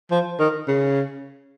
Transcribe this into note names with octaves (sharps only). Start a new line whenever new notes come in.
F3
D#3
C#3